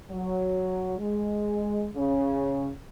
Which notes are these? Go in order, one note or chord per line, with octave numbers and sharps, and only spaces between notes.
F#3
G#3
C#3